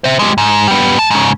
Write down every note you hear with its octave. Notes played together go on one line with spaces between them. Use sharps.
C5 E5
G#3 G4
G#2
G3 B3
G#2 A5
G#2 C#3